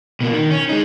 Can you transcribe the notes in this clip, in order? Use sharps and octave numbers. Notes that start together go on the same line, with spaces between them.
B2 A#3
D#3
C#4
G#3 D#4